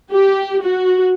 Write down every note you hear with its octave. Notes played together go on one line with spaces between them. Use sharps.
G4
F#4